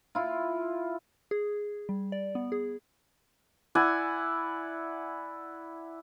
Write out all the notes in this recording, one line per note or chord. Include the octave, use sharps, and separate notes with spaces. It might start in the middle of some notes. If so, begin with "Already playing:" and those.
E4 F4
G#4
G3
D5
B3
G#4
E4 D5 F#5 G#5